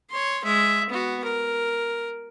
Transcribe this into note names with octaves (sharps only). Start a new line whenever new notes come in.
C#5 C6
G#3 E5
B3 F#4
A#4